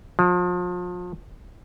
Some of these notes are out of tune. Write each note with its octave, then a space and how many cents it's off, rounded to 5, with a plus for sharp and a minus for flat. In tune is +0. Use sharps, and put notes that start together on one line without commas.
F3 +35